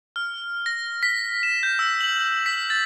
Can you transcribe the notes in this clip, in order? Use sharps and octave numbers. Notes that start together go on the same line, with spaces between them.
F6
A#6
B6
E7
G6
E6
F#7
B6
A6